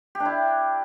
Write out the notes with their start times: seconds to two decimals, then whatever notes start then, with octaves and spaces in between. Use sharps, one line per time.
0.15 G4
0.20 D4
0.25 E4